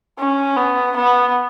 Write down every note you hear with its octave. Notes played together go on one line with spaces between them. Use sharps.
C#4
B3
B3